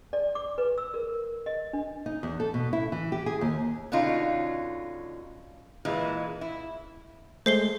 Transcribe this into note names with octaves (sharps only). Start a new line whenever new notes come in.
D5
D6
B4
E6
A#4
D#5
D4
D#4
E2
A4
B2
E4
E3
G4
G#4
D#2
B2 D3 C#4 D#4 F4
A#2 E3 G#3
E4
G#3 A3 C5 C7 G7